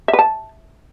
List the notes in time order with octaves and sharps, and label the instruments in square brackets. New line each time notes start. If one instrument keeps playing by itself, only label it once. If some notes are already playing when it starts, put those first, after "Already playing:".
[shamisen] E5
B4
A5